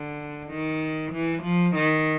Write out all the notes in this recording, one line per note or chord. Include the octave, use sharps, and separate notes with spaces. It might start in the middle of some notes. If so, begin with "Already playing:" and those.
Already playing: D3
D#3
E3
F3
D#3